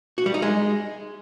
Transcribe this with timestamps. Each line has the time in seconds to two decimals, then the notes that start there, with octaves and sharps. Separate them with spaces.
0.18 F#4
0.26 G3
0.34 D#4
0.42 G#3